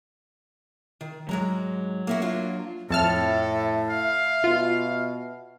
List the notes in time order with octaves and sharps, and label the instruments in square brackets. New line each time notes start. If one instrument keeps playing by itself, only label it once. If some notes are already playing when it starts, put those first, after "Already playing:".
[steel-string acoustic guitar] D#3
[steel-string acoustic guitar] G#2 G#3 A#5 [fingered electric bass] F#3
[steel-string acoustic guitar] A#3 E4 F#4
A#3 D4 F4
[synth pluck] F2 A5 F6 [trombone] A2 [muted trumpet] A4 [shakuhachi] E5
[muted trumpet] F5
[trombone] B2 [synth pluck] F4